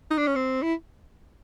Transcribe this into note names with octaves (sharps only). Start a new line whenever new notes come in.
D#4
D4
C#4
C4
E4